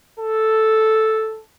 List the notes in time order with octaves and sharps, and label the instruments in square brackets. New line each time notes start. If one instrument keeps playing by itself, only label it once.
[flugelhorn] A4